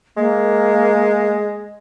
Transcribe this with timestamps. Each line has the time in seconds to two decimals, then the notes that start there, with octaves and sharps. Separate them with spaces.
0.17 G#3 A#3